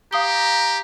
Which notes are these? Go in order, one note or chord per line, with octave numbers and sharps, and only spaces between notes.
G4 F5 A#5 D#6 G7